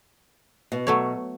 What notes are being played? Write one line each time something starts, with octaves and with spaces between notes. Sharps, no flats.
B2
F#3 A3 C#5